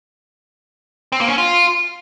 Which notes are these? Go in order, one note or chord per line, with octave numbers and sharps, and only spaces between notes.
C4
A#3
C#4
F4